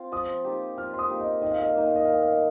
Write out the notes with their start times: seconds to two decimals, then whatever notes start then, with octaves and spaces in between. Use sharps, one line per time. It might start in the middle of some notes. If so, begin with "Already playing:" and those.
Already playing: C4 F4
0.12 F3 D#6
0.44 A#3 D#4 G4
0.78 F3 F6
0.93 C6
0.99 D#6
1.09 A#3 D#4 G4
1.20 D#5
1.42 D#3 D#5
1.51 F5
1.60 D#5
1.69 F5
1.75 A#3 D#4 D#5
1.87 F5
1.96 D#5
2.05 D#3 F5
2.13 D#5
2.23 F5
2.32 D#5